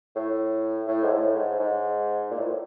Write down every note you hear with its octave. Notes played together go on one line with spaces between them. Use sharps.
A2
A2
G#2
A2
G#2
G#2
A#2
A2